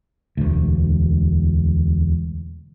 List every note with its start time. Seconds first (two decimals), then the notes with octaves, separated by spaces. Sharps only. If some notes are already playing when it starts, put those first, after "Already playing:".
0.37 E1 D2